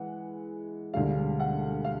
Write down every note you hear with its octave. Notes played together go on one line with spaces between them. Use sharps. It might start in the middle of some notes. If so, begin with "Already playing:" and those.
Already playing: E3 G#3 F#5
E1 D2 D3 G3 F5
F#5
F5